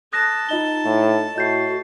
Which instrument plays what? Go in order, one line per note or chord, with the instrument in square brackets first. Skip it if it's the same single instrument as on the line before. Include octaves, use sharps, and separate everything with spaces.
[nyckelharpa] A4 A5 [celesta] D#6 F#6 A#6
[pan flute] D#4 [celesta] F4 D#5 G7
[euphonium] A2
[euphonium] A2 [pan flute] F#4 [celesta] D#5 G6 C7